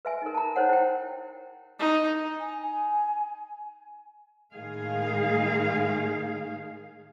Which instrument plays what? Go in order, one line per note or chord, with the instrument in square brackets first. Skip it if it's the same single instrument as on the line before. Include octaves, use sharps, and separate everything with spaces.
[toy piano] B4 E5 G#5
D#4 A#4
A5 A#5
D#4 C5 C#5 F#5
E4 G5
[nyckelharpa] D#4
[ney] G#5
G#5
[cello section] A2 D#3 G#3 G#4 F5